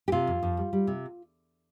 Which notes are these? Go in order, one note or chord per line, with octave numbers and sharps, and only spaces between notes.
G4
C3 F4
F2
F2
G3
G3
C3